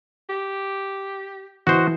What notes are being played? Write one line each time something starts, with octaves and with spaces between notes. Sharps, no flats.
G4
E3 F#4 C5 D#5